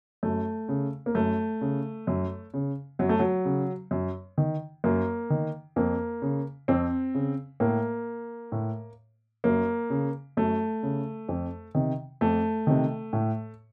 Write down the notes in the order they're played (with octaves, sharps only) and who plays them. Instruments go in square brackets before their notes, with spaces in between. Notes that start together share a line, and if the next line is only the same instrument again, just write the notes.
[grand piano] F#2 A3
C#3
A#3
F#2 A3
C#3
F#2
C#3
F#2 F#3
A3
F#3
C#3
F#2
D#3
F#2 A#3
D#3
F2 A#3
C#3
F2 C4
C#3
A2 A#3
A2
F#2 A#3
C#3
F#2 A3
C#3
F2
C3 D#3
F2 A3
C3 D#3
A2